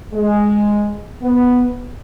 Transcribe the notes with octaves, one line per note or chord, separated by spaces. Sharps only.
G#3
B3